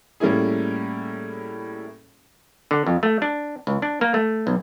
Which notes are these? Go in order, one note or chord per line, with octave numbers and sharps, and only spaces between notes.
A2 G3 A#3 C#4 E4 G#4
D3
F2
A3
D4
C#2
D4
A#3
A3
B1